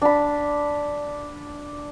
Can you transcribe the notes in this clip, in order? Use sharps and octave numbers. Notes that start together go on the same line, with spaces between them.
D4 B5